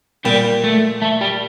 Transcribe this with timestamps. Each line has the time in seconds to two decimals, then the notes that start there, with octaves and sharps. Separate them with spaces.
0.25 A#2 G3
0.64 A3
1.02 A3
1.21 G3